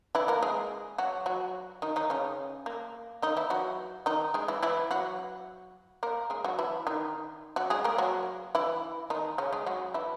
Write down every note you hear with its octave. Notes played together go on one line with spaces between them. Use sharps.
E3 E4
A#3 A#4
G#3 G#4
F#3 F#4
F#3 F#4
D#3 D#4
D#3 D#4
C#3 C#4
A#3
D#3 D#4
E3 E4
F#3 F#4
D#3 D#4
G#3 G#4
E3 E4
E3 E4
F#3 F#4
A#3 A#4
G#3 G#4
F#3 F#4
E3 E4
D#3 D#4
F#3 F#4
G#3 G#4
A#3 A#4
F#3 F#4
E3 E4
D#3 D#4
C#3 C#4
G#3 G#4
F#3 F#4
E3 E4